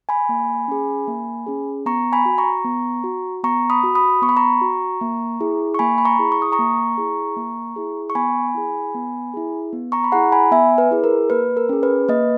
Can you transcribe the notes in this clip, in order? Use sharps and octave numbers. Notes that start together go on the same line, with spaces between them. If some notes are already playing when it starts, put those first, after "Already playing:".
G#5 B5
A#3
C#4 G#4
A#3
C#4 G#4
B3 A#5 C#6
G#5 B5
F#4
A#5 C#6
B3
F#4
B3 A#5 C#6
B5 D#6
F#4
B5 D#6
B3 C#6
B5
A#5 C#6
F#4
A#3
E4 G#4
C#6
A#3 G#5 B5
B5
A#5 C#6
E4 G#4
C#6
D#6
A#5 C#6
A#3
E4 G#4
A#3
E4 G#4
C#6
B3 G#5 B5
E4 G#4
B3
E4 G#4
B3
A#5 C#6
B5
E4 G#4 F#5 A#5
G#5 B5
B3 E5 G#5
B4
E4 G#4
A#4
A#3 B4
A#4
C#4 G#4
B4
A#3 B4 D#5